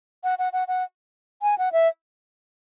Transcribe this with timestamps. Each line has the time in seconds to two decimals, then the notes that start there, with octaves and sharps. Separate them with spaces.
0.24 F#5
0.39 F#5
0.53 F#5
0.68 F#5
1.42 G#5
1.58 F#5
1.72 E5